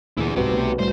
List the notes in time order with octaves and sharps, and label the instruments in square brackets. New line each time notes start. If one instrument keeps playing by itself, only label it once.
[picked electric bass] D2 A#2 E3 [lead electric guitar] E4 G#4
[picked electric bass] D1 G#2 [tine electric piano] C2 F#4 B4 [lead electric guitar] C4 G4
[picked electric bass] B1 B2 A3
[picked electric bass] A2 G3 A3 [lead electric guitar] C5